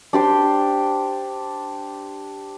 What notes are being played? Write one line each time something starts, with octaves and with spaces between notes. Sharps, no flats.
D4 G4 C5 G5